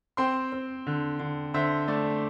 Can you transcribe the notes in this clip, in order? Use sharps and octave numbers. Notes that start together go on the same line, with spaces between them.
C4 G5 C6
C4
D3
D3
D3 C5 E5
A3 D5